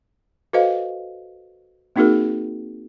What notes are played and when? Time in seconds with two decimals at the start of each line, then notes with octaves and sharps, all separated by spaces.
0.53 F#4 A4 B4 C5 D#5 F5
1.96 A#3 C4 D#4 F#4 G#4 A#4